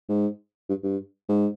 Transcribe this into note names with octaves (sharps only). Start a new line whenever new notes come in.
G#2
G2
G2
G#2